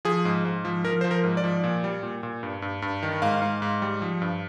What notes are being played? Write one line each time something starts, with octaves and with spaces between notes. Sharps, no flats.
F3 G#4
G#2
G#2
F3
F3 A#4
F3 C5
A#4
G#2
D5
F3
A#2
G3
A#2
A#2
G2
G2
G2
D#3
G#2 F5
G#2
G#2
G3
F3
G2